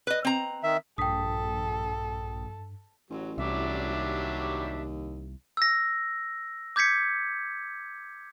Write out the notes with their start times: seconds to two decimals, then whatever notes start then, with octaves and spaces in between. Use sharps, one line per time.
0.07 B4 D#5
0.25 C4 A#5
0.63 D#3 E5
0.98 A#1 G2 A4 G5 D#6 B6
3.10 A1 F#3
3.38 C2 F#3 G3 D4 E5
3.93 D#2
5.57 E6 A#6
6.76 D6 G6 G#6 B6 C#7